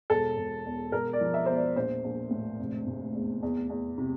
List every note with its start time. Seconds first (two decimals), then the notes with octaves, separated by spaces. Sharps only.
0.10 E1 A4
0.37 E1
0.66 E2
0.92 E1 A#4
1.13 D5
1.20 F3
1.34 E5
1.46 E2 C5
1.56 D5
1.76 A#1 C5
2.04 A#1
2.31 A2
2.60 F1
2.87 F1
3.15 E2
3.43 E2
3.70 E2
3.98 C3